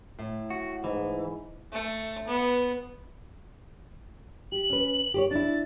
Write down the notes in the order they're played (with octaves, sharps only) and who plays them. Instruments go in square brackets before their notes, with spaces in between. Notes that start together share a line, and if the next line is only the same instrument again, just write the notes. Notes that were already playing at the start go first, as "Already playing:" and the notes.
[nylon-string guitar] A2
[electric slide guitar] F#4
[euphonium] G#2 [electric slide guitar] E3
[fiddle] A3
B3
[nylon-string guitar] G4 [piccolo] F#7
[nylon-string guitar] C#4 B4
G4 C5 C#5
[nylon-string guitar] D4 E4 [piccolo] A6